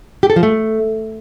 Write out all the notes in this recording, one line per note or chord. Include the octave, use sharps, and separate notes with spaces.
G4
A4
F3
A3